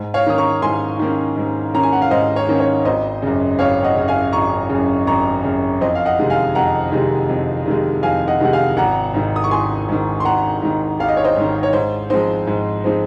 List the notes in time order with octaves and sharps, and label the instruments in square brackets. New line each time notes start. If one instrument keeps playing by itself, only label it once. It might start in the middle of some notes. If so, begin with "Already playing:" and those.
Already playing: [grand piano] G#2
C#5 F5
D#3 A#3 C#4 D#6
A#5 C#6
G#2 G#5 C6
D#3 A#3 C#4
G#2
D#3 A#3 C#4 A#5
G#5
F#5
F5
G#2 C5 D#5
C#5
D#3 A#3 C#4
C#5
G#1 C5 D#5
F#2 C#3
G#1 C#5 F5
D#5 F#5
F#2 C#3
F5 G#5
G#1 A#5 C#6
F#2 C#3
G#1 A#5 C#6
F#2 C#3
F2 C5 D#5
F5
D#5 F#5
C3 D#3 G#3
F5 G#5
F2 F#5 A#5
C3 D#3 G#3
F2
C3 D#3 G#3
F2 F5 G#5
D#5 F#5
C3 D#3 G#3 F#5
F5 G#5
G#1 F#5 A#5
G#2 D#3
D#6
C#6
G#1 G#5 C6
G#2 D#3
C6
G#1 F#5 A#5
G#2 D#3
G#1 F5
D#5
C#5
C5 D#5
G#2
D#3
C#5
G#2 C5
F3 G#3 C4 D#4 C5
G#2
F3 G#3 C4 D#4